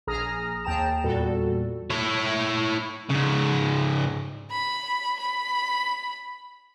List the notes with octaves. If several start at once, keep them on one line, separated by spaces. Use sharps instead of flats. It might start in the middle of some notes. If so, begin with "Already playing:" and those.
A#1 G#4 A#5 D#6 F6 A#6
D#2 G#4 G5 A5 A#5 E7
E2 A#2 G3 F#4 A4
E4 C#5
G#2 C#3
B5
B5